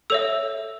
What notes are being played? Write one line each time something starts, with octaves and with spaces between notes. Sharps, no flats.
A4 C#5 E5 E6